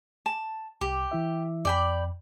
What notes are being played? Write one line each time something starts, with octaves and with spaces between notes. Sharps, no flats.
A5
C2 G4
E3 E4 E5
F2 D5 G5 B5